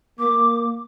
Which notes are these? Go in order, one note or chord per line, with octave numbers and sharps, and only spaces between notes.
A#3 D6